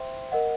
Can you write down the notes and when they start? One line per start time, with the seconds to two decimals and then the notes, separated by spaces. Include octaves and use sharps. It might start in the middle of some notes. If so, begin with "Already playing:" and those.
Already playing: C5 E5 G5 C6
0.32 A#4 D#5 F#5